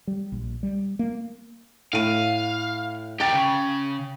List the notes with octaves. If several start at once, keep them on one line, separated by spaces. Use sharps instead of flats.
G3
A#1
G3
A#3
A2 F5 D#7
G4 A#4 G5 A6
C#3